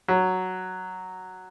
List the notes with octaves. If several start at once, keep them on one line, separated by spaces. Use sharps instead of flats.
F#3